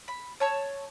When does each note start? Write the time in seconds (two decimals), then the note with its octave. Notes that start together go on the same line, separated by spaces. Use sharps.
0.08 B5
0.40 C#5 A5 E6